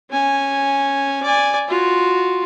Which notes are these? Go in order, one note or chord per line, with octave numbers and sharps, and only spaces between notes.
C#4 G#5
D5 G#5
F4 F#4